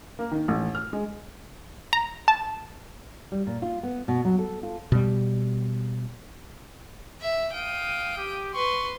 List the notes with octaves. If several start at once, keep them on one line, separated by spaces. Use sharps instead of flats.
A#3
D#3
A1
F6
G#3
A#5
A5
G3
A#2
F4
B3
B2
F#3
A4
F4
B2 G3
E5
F5 G5 D#6
G4
B4 C6 C#6